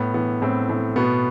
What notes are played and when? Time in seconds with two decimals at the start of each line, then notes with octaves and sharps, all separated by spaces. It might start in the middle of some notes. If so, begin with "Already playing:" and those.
Already playing: A2 B3
0.14 E3 B3
0.42 A2 C4
0.69 A2
0.96 B2 B3